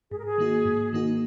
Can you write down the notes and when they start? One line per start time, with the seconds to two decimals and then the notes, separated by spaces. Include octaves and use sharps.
0.11 G#2 G#4
0.18 A#4
0.26 G#4
0.38 D#3 A#3 D#4 F#4
0.65 G#2
0.93 D#3 A#3 D#4 F#4